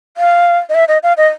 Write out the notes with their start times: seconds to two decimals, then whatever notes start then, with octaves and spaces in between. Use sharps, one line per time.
0.17 F5
0.69 D#5
0.74 E5
0.88 D#5
1.03 F5
1.17 D#5